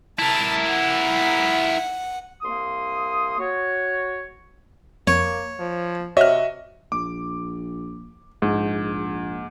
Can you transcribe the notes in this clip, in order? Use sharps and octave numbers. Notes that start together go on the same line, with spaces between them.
E4 A#4 A5
F#5
C2 A#3 C6 D#6
F#4 C#5
F2 A#3 C#5 D7
F3
C3 F#4 C#5 D#5 E5 F6
A#1 D6
A#1 G#2